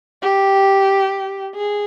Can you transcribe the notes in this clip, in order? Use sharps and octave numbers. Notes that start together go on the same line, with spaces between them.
G4
G#4